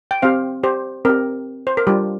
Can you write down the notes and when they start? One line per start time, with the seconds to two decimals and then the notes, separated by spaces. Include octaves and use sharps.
0.11 G5
0.22 C4 G4 C5 F5
0.63 G4 C5
1.05 C4 G4 A#4
1.67 C5
1.77 A#4
1.87 G3 D4 F4 G4